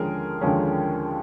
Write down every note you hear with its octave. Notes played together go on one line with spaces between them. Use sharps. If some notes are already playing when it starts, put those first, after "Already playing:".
Already playing: D#2 D3 F3 G#3 C#4 G#4 A#4
D#2 D3 F3 G#3 C#4